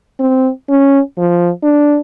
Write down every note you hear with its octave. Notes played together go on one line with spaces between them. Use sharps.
C4
C#4
F3
D4